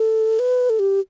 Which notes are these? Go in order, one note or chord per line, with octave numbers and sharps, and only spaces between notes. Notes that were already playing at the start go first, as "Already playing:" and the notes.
Already playing: A4
B4
A4
G4